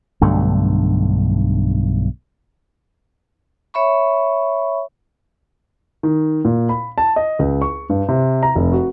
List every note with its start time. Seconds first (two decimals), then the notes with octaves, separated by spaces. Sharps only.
0.21 B1 G2 D3 A3
3.74 C#5 E5 B5 C#6
6.03 D#3
6.45 A#2
6.69 B5
6.98 A5
7.16 D#5
7.39 C#2
7.62 C#6
7.90 G2
8.08 C3
8.43 A#5
8.55 F1
8.72 F#4